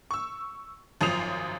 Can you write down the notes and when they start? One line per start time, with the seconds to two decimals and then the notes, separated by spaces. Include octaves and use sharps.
0.11 C#6 E6
1.01 G#1 F#2 F3 D#6 C7 F7